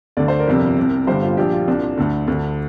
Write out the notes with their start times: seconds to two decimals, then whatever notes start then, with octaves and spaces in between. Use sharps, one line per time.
0.17 D2 D3 D5
0.28 C5
0.39 A#4 D5
0.47 G1 F2 C3
0.77 C2 C3
1.07 G1 G2 D3 G4 C5
1.22 F4
1.37 A#1 A#2 D4 G4
1.52 F4
1.68 C2 A#2 D4
1.98 D2 D3
2.28 D2 D3